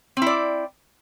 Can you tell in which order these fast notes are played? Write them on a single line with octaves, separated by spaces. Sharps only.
C4 E4 D5